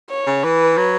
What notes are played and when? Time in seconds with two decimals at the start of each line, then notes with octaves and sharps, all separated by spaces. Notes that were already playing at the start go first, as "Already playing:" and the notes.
0.10 C#5
0.26 C#3
0.44 E3 B4
0.77 F#3